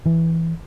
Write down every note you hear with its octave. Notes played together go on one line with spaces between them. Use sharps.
E3